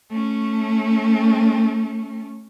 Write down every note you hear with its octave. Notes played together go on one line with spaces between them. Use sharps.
A3 C#4